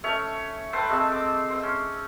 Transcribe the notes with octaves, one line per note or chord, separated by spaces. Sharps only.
A3 C#4 C#5 E5
A4 B4 C5 G5
G#3 A3 C4
D6
C5 E6
C#4